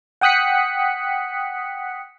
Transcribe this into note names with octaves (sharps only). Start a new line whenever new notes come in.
F#5 G5 D#6 F#6 B6 C#7